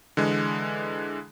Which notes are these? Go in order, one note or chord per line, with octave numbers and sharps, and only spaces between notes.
D3 E3 G#3